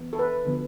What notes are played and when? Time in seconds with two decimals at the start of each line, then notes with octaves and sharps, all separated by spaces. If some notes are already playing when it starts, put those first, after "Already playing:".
Already playing: E3 B3
0.13 A4
0.19 B4
0.45 D3 F3 B3